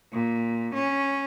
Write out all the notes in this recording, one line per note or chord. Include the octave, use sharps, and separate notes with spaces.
A#2
C#4